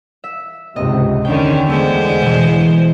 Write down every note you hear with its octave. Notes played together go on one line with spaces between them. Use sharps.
E5
C#2 G#2 C3 D#5
E2 D3 D#3 C#4 D4 G5
G#3 A3 B3 C5
B2 E3